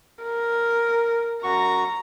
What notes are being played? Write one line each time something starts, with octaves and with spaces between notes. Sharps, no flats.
A#4
F#2 F#4 A#5 C#6